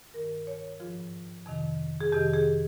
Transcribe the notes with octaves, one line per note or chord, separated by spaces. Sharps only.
G2 D#3 A#4
C#5
G#2 F3 F4
F2 C3 D#3
G#4
F2 C3 D#3 G4
G#4